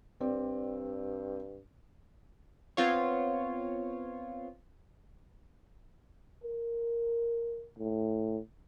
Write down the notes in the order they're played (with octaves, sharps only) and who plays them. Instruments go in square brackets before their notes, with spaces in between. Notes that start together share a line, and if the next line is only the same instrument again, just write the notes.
[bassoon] G2 [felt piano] C4 D5
[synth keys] B3 C4 F4 C#5
[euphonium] A#4
A2